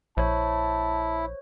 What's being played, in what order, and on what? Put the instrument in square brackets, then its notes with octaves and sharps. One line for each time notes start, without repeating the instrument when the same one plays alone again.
[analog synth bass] A#1 [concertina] E4 [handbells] C5 C#5 [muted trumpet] A5